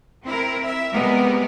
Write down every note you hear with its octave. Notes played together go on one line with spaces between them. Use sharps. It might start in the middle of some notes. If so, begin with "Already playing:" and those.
C4 E4 A#4
E5
C3 G3 G#3 B3 A#4